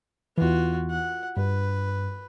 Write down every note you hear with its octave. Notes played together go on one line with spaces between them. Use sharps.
E2 E3 F4 F#4
F#5
G2 B4